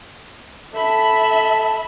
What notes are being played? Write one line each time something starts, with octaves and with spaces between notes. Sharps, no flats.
A4 E5 B5